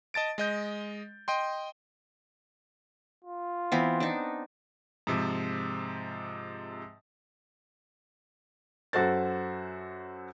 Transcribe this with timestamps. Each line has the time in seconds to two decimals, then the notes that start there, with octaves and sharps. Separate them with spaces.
0.14 D#5 A5 A6 D7
0.38 G#3 D#5 G6
1.28 D#5 G5 C6
3.24 F4
3.72 E3 B3 C4
4.00 D4 D#4
5.07 G#2 C3 F3
8.93 F#2 F#4 A4 C5 A6